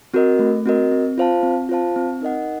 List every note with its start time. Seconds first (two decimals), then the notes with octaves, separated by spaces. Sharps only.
0.14 C4 F#4 A#4 D#5
0.39 A3
0.66 C4 F#4 A#4 D#5
0.92 C4
1.18 F4 C5 F5 A5
1.43 C4
1.69 F4 C5 F5 A5
1.96 C4
2.21 D#4 A#4 D#5 F#5